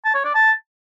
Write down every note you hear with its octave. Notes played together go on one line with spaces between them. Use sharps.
A5
C#5
D5
A5